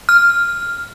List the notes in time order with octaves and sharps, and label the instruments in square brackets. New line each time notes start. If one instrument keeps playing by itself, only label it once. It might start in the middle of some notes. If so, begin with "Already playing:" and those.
[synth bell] F6